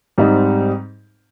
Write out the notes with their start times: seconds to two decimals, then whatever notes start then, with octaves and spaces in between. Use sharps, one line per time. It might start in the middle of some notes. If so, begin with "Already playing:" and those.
0.18 G#2 G3 C4 D#4